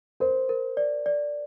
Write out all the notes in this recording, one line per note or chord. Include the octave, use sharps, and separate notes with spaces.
A#4 C5
A#4
D5
D5